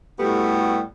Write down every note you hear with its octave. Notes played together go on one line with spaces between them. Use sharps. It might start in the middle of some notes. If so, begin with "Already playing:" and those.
A2 G3 A3 B3 F#4 G4